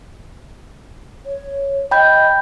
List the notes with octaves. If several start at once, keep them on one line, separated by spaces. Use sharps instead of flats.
C#5
D#5 G5 B5 G6